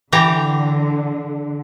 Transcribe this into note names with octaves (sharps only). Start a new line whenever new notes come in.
D3 E3 G4 A#5